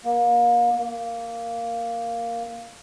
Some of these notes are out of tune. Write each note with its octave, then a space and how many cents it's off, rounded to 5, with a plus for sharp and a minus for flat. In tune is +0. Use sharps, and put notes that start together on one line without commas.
A#3 +35
A#3 -5